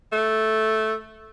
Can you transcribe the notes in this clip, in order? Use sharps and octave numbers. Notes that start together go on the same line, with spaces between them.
A3